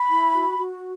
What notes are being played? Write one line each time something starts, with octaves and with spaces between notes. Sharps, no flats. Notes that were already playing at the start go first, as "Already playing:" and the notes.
Already playing: B5
E4
F#4
F#4